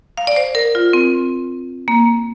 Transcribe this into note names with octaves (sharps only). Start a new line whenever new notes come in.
F5
D5
C5
A#4
F4
C4
A#3